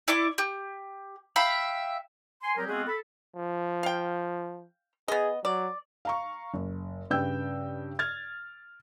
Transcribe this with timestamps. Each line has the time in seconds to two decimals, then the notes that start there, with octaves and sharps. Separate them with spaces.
0.08 E4 D5 C#6 D6
0.38 G4
1.36 E5 F5 G5 B5
2.43 G#5 C6
2.58 F#3 G3 C4 G4 G#4 A#4
2.69 G#3 B3 C4 F4 F#4 G#4
2.87 A4 B5
3.37 F3
3.83 F5 G5
5.08 B3 G#4 D#5
5.45 F#3 D5
6.05 F5 A#5 C#6
6.54 F#1
7.10 G2 C#3 B4 G5 E6 G6
7.99 F6 G#6 A6